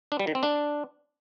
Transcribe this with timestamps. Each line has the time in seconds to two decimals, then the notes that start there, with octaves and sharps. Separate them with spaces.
0.12 D4
0.19 G3
0.27 D#3
0.35 C4
0.43 D4